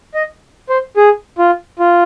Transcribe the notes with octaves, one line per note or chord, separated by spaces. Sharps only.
D#5
C5
G#4
F4
F4